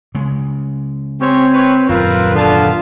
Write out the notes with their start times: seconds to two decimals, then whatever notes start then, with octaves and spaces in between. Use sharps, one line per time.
0.15 C#3 G#3
1.21 C4 C#4 G4 C#5
1.54 B4 C#5
1.89 D#1 F#2 A#2 C4 F4 A#4 B4
2.35 D3 B3 F5 A5